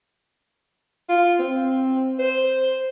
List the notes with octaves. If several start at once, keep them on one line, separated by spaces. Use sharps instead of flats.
F4
C4
C5